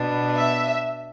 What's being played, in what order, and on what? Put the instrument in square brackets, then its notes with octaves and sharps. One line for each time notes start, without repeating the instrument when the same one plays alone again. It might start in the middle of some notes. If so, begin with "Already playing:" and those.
Already playing: [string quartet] B2 B3 D4
[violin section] E5